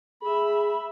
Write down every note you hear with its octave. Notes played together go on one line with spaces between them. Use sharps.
G#4 E5 B5